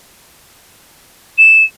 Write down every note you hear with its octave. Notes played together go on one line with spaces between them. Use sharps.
E7